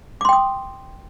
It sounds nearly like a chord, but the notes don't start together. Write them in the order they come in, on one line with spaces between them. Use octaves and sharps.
D6 C6 G5 D#6